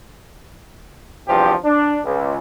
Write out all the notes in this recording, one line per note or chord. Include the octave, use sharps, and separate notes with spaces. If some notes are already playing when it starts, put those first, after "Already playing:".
E2 G2 C3 F3 G4
D4
C#2